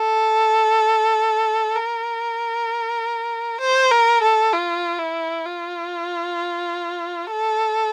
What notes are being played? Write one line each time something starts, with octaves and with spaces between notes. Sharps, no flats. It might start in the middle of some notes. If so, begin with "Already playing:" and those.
Already playing: A4
A#4
C5
A#4
A4
F4
E4
F4
A4